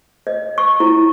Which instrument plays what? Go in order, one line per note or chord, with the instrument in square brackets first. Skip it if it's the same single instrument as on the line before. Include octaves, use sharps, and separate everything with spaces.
[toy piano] D#5
C#6
E4